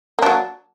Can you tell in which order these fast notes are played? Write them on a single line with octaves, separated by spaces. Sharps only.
A#3 D4 F#3